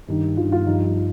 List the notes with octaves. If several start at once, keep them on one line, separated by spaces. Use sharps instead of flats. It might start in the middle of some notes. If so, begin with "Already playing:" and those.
G2 D#3
G2 D#3 F4
F4
G2 F3 D#4